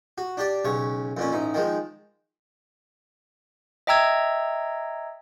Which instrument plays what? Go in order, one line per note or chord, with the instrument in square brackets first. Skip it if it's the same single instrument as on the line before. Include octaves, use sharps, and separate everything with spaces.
[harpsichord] F#4
D4 G4 D5
B1 C#3 C#5
F2 A#2 C#4
A1 D#4
D#3 F3 G#3
[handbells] D#5 E5 G5 A#5 E6 G#6